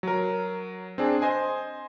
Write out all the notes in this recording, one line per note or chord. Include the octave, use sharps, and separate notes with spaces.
F#3 A#4
C4 D4 G#4
C5 D#5 G#5